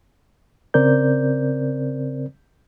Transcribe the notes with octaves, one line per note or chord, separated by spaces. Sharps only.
C#3 C4 A#4 C5 D5 G6